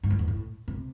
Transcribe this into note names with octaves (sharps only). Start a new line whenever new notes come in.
G#2
F#2
E2
A2
C3